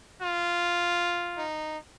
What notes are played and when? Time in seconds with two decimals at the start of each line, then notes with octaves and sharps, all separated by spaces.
0.22 F4
1.38 D#4